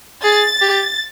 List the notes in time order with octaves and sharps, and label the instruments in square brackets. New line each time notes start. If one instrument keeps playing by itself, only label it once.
[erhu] G#4 [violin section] A6
[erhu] G4